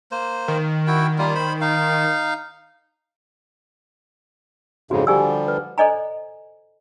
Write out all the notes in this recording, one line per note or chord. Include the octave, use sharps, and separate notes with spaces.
A#3 C5
D#3
E4 F#4 G5
G3 A#3 F4
C5 B5
D#4 F5
F2 G#2 C#3 F#4
D3 F3 G3 G4 G#5 E6
B4
A4 C5 D5 D#5 G#5 A#5